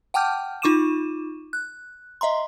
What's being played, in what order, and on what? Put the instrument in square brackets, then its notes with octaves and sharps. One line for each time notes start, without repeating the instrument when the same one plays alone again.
[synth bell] F#5 G5 A5 D6 F6 G6
D#4 F4 C#6 D6 D#7 E7
F#6
D#5 E5 A#5 C6